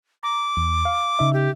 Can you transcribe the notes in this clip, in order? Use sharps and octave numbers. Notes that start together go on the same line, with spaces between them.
A#5 D6
E2
F5
C#3 D#4 E5
G4